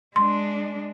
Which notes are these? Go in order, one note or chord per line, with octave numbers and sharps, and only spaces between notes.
G#3 D4 C6